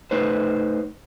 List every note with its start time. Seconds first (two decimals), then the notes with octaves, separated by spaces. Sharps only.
0.11 A3 D#4 B4 C5